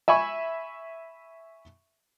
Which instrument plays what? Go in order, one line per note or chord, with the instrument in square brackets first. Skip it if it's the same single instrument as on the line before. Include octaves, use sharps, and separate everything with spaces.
[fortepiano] E5 G#5 B5 C#6